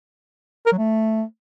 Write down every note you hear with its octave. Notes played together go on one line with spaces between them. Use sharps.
A#4
F#3
A3